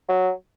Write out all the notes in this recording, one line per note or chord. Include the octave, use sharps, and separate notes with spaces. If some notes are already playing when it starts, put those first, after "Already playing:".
F#3